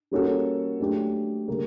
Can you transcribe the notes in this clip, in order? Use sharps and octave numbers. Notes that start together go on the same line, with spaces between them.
G3 A#3 C#4 F#4 A4
F#3 A3 D4 G4
D3 G3 A#3 D4